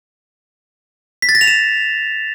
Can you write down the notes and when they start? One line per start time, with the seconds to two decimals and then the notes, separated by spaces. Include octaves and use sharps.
1.22 B6
1.29 A6
1.35 A#6
1.41 F7
1.47 E7